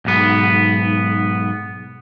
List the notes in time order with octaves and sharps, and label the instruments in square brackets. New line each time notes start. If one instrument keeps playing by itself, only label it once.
[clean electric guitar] B1 G#2 B3